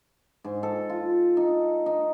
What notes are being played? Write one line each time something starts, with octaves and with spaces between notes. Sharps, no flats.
G#2
A4
F4
D#4
D#4